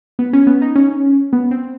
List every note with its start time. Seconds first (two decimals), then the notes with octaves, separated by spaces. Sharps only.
0.19 B3
0.33 C#4
0.47 B3
0.62 D#4
0.76 C#4
1.33 B3
1.51 C4